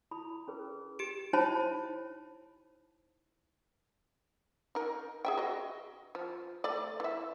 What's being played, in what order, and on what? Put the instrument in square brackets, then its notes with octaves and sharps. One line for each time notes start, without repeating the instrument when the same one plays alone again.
[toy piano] E4 B5 D#6
C#4 G#4 B4
[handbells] G4 D7
[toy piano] D#4 E4 C5 C#5 A5 B5
[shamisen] D#4 A#4
G#4 E5 G5
F#4 D#5
F3
A3 D5
E3 E5